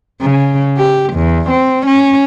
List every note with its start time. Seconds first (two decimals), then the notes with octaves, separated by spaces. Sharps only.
0.21 C#3
0.78 G4
1.14 E2
1.50 C4
1.87 C#4